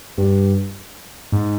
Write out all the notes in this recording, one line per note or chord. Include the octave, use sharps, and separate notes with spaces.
G2
G#2